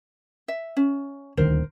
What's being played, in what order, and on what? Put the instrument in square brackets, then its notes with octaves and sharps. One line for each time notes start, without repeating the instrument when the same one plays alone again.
[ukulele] E5
C#4
[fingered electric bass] D#1 D2 D#3 [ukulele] A#4 C5